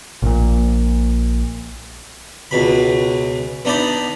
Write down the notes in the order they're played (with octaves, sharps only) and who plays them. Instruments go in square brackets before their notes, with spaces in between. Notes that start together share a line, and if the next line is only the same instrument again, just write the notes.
[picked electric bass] A#1 A#2
[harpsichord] C#2 B2 B5
B3 D4 D#4 D5 B5